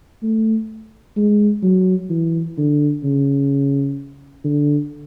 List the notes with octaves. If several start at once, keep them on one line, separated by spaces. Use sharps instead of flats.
A3
G#3
F#3
E3
D3
C#3
D3